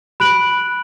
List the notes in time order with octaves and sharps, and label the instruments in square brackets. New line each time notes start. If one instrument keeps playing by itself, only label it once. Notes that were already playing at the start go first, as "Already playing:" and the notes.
[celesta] B5 F#6 D7 F#7